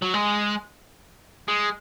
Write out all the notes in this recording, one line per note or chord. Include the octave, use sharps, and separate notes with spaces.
F#3
G#3
G#3